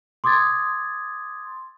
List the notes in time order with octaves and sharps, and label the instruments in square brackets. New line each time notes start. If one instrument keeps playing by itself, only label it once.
[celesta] C6 D6 D#6 G#6 A6